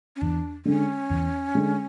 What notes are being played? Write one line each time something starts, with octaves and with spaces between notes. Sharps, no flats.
C#4
E2 D4
D3 G#3 C#4
E2
D3 G#3